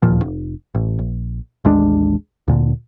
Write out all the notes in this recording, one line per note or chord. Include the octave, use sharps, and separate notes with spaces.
D1 D#2 A#2 F3
F1
A1
A#1
A1 D#2 G#3 D4
D2 A#2 D3